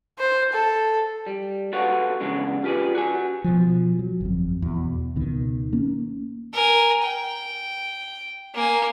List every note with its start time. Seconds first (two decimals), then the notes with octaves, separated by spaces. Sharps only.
0.19 C5
0.53 A4
1.26 G3
1.73 F#4 A4 B4 C#5 F5 F#5
2.20 C#3 E3 G#3 B3 D4
2.64 F4 G4 G#4 B4 D5
2.95 F#4 G#5
3.44 B2 F3
3.99 F#3
4.21 G1 F2
4.62 E2 B2
5.15 C#2 B2 D#3
5.73 A#3 C#4
6.53 A#4 G#5
7.02 G5
8.55 A#3 G#5